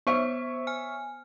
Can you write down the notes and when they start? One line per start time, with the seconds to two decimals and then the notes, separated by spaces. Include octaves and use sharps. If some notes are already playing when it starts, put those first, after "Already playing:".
0.07 B3 C5 C#5 E5 C#6
0.67 G#5 F6